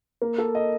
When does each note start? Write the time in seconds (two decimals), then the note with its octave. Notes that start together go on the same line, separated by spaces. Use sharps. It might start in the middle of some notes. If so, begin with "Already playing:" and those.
0.22 A#3
0.38 A4
0.55 D#5